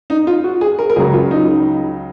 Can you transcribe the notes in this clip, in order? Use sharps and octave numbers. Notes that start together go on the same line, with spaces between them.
D#4
F4
F#4
G#4
A#4
A#4
C#2 C#3 F#3 G#4
F4
D#4